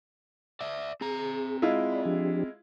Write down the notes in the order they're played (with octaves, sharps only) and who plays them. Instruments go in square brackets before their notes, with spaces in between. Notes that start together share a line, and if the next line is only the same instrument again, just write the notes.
[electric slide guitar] D5 E5
[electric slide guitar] C4 A#5 [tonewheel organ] G#4
[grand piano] G#3 E4 F4
[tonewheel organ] D5 B5
F3 D4 G4